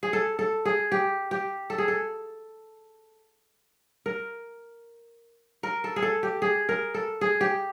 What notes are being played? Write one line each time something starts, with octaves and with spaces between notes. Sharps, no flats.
G#4
A4
A4
G#4
G4
G4
A4
G#4
A4
A#4
A#4
A4
G#4
A4
G4
G#4
A#4
A4
G#4
G4